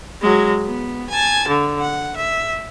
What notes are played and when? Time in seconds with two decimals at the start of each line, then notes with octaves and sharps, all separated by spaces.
0.21 F#3 G#3
0.65 B3
1.10 G#5 A5
1.48 D3
1.81 F#5
2.16 E5